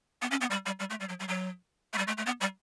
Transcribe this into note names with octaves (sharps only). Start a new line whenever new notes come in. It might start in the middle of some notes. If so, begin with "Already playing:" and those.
B3
C#4
B3
G3
G3
G3
A3
G3
F#3
G3
F#3
A3
G3
A3
A3
B3
G3